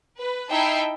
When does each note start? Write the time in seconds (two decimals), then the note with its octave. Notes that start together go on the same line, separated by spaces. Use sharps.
0.18 B4
0.50 D#4 E4 E5 G5 A5 C7